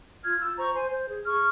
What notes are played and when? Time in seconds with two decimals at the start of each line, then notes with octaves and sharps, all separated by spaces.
0.24 F4 F6 G#6
0.40 F4 E6 G6
0.58 C5 A#5 C#6
0.74 C5 G#5 C6
0.92 C5
1.09 G#4
1.25 G#4 C#6 F6